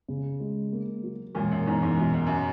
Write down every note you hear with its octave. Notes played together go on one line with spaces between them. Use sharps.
C#3
G#3
A#3
F#3
E1 F#2 A#2
F#2
E2 G#2
G#2
F#2 B2
F#2
F#2